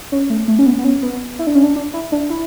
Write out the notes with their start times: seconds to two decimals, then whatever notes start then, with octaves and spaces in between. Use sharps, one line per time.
0.12 C#4
0.30 A3
0.48 A3
0.59 C#4
0.66 B3
0.78 B3
0.84 C#4
1.03 B3
1.39 E4
1.47 D4
1.55 C#4
1.63 D4
1.76 D4
1.94 E4
2.12 D4
2.30 E4